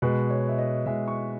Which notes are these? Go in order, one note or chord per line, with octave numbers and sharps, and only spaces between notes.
B2 G#3 B4
C#5
E5
D#5
B2 G#3 E5
C#6